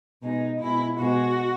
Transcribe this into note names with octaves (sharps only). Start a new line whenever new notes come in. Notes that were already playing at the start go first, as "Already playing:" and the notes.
B2 G#3 D#4
B2 G#3 E4
B2 G#3 F#4